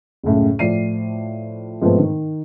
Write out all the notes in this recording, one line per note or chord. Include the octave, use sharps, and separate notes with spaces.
C#2 F#2 A2 C#3
A2 F3 D5 C7 D#7
G#2 B2 F3 A3 B3 C4
D#3